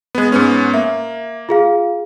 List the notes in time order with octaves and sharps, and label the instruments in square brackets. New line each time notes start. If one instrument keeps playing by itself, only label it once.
[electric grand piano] G#3 B3
G#2 B3 C#4
[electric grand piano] A#3 [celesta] E5
[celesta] F4 G#4 F5